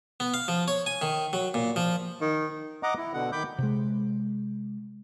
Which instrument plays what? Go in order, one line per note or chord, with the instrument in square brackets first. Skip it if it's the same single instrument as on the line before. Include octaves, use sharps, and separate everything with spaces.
[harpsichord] B3
F5
F3
C#5
G#5
D#3
F#3
A#2
F3
[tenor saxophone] D#3
[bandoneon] D#5 F#5 A#5 D6
E4
B2 D3 F#5
D#3 B5 D6 G6
[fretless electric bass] C3 G#3